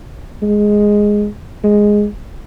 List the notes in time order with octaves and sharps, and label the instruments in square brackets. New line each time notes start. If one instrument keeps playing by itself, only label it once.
[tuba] G#3
G#3